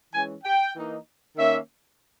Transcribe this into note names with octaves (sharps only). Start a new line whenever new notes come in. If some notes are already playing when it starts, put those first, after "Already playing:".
E3 G#3 C#4 G#5
G5
E3 A#3 D#4
D#3 A#3 C#4 E5